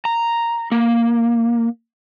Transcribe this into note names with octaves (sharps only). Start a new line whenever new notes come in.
A#5
A#3